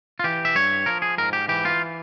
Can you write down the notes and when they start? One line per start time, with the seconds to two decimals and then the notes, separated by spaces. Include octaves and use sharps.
0.19 F4
0.24 E3 G4
0.45 E5
0.55 G2 C#5
0.86 F3 A#4
1.02 G#4
1.18 G#2 A#4
1.33 G4
1.48 E3 G4
1.65 F4